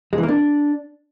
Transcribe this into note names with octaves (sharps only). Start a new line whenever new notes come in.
G#3
E3
A#3
D4